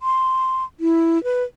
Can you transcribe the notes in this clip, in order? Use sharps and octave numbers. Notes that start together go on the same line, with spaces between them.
C6
E4
B4